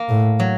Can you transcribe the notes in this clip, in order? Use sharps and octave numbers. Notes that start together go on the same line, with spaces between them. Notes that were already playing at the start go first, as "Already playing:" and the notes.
Already playing: A#3
A2
F#3